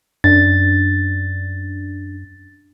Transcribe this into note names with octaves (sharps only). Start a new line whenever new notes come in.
F#2 D4 A6